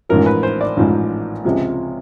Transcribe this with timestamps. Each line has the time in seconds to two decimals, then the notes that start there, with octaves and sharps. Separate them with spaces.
0.09 A1 G#2 F3 A#4
0.26 B4
0.43 C5
0.61 D5
0.77 A1 G#2 F3
1.44 C#2 C3 F3 G#3